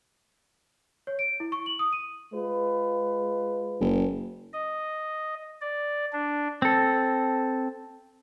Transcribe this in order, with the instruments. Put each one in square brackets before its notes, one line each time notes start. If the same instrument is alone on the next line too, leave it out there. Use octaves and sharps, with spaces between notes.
[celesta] C#5
D7
E4
C#6
F#7
D#6
D#7
[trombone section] G#3 F4 B4
[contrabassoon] F#1
[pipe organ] D#5
D5
D4
[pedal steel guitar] C4 A4